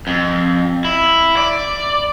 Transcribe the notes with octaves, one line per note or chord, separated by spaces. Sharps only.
F2
E4
D5